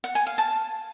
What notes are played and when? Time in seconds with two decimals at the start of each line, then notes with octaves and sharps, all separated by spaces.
0.04 F#5
0.15 G#5
0.27 F5
0.38 A5